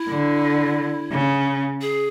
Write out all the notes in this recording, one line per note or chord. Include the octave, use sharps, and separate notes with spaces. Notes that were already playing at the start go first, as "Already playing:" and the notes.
Already playing: E4
D3
C#3
G#4